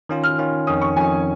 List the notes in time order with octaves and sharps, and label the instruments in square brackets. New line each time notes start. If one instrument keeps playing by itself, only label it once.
[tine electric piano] D#3 C#4 F4
[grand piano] F6
[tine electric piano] D#3 C#4 F4
[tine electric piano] F2 D#3 C#4 [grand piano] D#6
[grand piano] C#6
[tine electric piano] F2 D#3 C#4 [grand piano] G#5